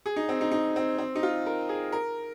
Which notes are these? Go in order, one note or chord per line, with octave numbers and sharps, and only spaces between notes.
G#4
D#4
C4
D#4
D#4
C4
C4
D#4
F4
A#4
G#4
A#4